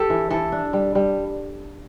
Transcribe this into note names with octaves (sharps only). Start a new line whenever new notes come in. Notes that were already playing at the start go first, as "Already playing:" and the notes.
Already playing: G4 A4
E3
E3 A4
D4
G3
G3